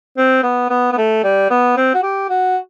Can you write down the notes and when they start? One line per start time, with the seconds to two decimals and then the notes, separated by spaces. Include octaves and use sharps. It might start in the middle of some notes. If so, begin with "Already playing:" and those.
0.18 C4
0.43 B3
0.70 B3
0.93 B3
0.97 A3
1.24 G3
1.51 B3
1.77 C4
1.94 F#4
2.03 G4
2.29 F#4